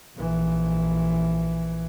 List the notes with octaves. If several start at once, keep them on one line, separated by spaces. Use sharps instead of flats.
A#1 E3